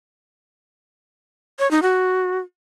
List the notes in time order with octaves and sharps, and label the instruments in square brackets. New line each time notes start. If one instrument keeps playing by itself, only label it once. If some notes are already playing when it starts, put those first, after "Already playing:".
[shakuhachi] C#5
D#4
F#4